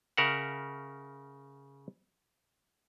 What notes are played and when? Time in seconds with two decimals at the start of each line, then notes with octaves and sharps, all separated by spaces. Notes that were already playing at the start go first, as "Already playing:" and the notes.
0.17 C#3 A#4 E5 F#5